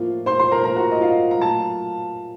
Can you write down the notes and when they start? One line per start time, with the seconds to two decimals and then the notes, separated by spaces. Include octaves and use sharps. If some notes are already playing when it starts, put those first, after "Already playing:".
Already playing: A2 F3 A#3 F4
0.26 C5 C6
0.39 C5 C6
0.51 A#4 A#5
0.64 A2 F3 A#3 A#4 A#5
0.76 F#4 F#5
0.91 D#5
1.01 F4 F5
1.31 A#5
1.39 A#2 F#3 A3 A5